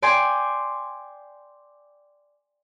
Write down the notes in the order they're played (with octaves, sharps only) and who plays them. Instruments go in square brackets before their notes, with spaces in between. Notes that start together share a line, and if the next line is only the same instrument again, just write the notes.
[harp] D5 G5 G#5 C6 G#6